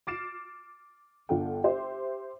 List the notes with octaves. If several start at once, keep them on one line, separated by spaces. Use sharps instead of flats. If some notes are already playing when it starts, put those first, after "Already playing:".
D6 F6 A6 C7 D7 E7
G1 D3 F4 A4 F#5 G5
G4 C5 E5